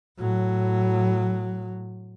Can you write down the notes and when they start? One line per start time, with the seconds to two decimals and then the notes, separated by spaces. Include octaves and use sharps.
0.18 A2 F#3